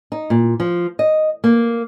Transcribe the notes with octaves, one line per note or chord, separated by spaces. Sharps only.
D#4
A#2
F3
D#5
A#3